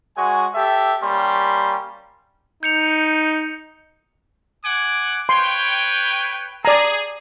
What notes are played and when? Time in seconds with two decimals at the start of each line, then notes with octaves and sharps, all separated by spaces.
0.16 G#3 F#4 C#5 G#5
0.54 G4 A4 E5
1.02 G3 A#3 C#4 C6
2.63 D#4 G6 C#7 F7
4.64 F#5 G#5 D6
5.29 B4 C#5 G5 C6
6.65 G#4 D5 A#5